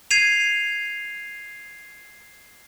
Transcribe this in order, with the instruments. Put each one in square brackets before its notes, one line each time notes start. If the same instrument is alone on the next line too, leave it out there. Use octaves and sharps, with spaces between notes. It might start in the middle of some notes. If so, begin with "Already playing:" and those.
[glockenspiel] G#6 C7 D#7 F7